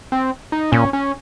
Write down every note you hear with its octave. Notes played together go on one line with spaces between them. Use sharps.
C4
D#4
A#2 C#4
C#4